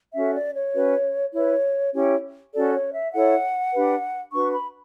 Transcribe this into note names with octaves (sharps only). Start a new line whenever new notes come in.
C#4 F#4 A4 E5
D5
C#5
C#4 F#4 B4
E4 B4 C#5
C#4 E4 G4 C#5
C#4 F#4 A4 D5
C#5
E5
E4 A4 C#5 F#5
D4 G4 B4
D4 F#4 B4 C#6
B5